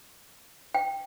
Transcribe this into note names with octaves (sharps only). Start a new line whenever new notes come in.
G5